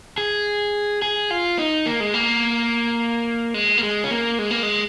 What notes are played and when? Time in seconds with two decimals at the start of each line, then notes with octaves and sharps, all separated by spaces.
0.18 G#4
1.02 G#4
1.30 F4
1.59 D#4
1.86 A#3
2.00 G#3
2.14 A#3
3.54 G#3
3.78 A#3
3.83 G#3
4.04 C#4
4.10 A#3
4.39 G#3
4.51 A#3
4.63 G#3